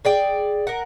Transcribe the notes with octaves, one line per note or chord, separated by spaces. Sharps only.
G#4 D5 G5
A#4 F#5